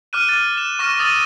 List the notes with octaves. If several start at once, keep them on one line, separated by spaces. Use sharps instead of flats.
D6 F6 F#6 D#7
F#6 A6
E7
C#6 D6 F6 A#6
D#6 E6 A6 D#7